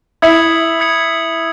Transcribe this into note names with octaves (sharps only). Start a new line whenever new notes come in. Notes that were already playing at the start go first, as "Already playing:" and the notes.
E4 D#6 G#6 C#7 F#7
D#6 G#6 C#7 F#7